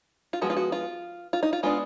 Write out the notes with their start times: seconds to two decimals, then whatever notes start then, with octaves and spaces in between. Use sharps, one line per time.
0.33 F4
0.41 F3 G#3 B3 F#4
0.50 F4
0.57 F#4
0.72 F4
1.33 F4
1.43 D#4
1.53 F4
1.63 G#3 B3 D4 F4